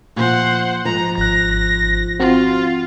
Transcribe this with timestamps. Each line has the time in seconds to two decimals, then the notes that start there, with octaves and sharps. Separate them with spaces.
0.16 A#2 F3 C5 F#5
0.85 G#2 F3 A#5
1.18 G#1 F#6 A#6
2.20 C4 F4 F#4